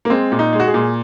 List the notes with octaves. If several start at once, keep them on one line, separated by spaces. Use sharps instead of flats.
A#3
G#3 C4
A#2
D#4
G#3
F#4
G#4
A#2